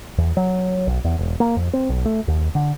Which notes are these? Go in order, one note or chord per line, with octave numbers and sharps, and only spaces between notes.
E2
F#3
B1
E2
E1
A#3
F2
C4
B1
A3
D#2
D3